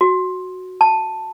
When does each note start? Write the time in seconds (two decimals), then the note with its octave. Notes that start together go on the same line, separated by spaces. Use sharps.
0.01 F#4
0.81 A5